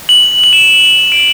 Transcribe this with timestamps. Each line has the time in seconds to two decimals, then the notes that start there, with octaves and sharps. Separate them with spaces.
0.09 F#7
0.44 F#7
0.53 E7
1.12 D7